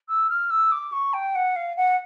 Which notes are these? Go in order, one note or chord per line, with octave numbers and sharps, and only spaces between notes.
E6
F6
E6
D6
C#6
G5
F#5
F5
F#5